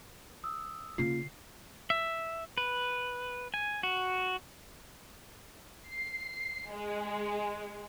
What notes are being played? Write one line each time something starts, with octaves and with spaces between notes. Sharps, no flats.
D#6 E6
C#3 A#3 F4 C7
E5
B4
G#5
F#4
C7
G#3